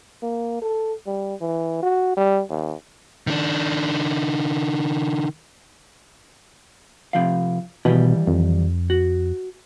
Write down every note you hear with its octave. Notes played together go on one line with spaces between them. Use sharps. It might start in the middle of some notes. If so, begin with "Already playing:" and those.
A#3
A4
G3
E3
F#4
G3
D#2
D#3 D4
C3 F3 F5
B2 D#3 E3 G3
F2
F#4